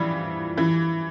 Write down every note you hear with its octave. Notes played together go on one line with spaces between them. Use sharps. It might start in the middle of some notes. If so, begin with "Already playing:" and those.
Already playing: E3 F3 G3
E3